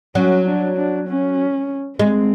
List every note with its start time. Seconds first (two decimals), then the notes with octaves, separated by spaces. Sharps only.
0.15 F#3 C#4
0.46 D4
0.77 D4
1.08 C#4
1.99 G#3 C4